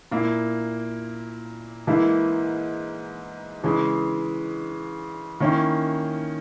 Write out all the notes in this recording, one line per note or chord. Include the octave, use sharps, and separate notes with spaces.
A#2 A#3 E4
G#2 E3 A#3 E4
C#3 E3 G#3
D#3 A#3 C#4 E4